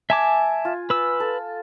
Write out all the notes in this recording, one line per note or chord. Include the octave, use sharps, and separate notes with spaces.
E5 G#5 A5 D6
F4
B4 E6
A4